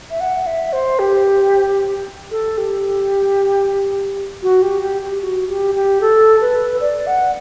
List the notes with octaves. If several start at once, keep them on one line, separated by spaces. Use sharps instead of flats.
E5
F#5
E5
C5
G4
A4
G4
F#4
G4
G4
G4
F#4
G4
G4
A4
B4
D5
F#5